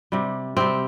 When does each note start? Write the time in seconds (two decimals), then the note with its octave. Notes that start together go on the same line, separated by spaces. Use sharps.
0.12 C3 G3
0.57 C3 G3 C4